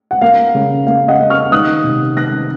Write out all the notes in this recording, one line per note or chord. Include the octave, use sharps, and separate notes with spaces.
F#5
A#3 F5
C#3
A#3 F5
D#5 F#5
A#3
C#6 F6
D#3 D#6 F#6
C3
D#3 F#6 A#6